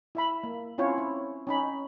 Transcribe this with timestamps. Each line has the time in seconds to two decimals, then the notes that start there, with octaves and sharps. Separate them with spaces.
0.15 E4 E5 B5
0.44 A#3
0.78 C4 C#4 E4 F4 C#5
0.98 E4
1.47 C#4 D#4 B5